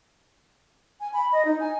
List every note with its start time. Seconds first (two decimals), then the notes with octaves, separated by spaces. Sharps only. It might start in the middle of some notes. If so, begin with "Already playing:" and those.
1.00 G#5
1.13 B5
1.32 D#5
1.45 D#4
1.60 G#5